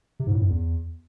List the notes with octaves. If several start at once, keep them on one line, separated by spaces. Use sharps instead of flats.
C3
G#2
A2
F#2
E2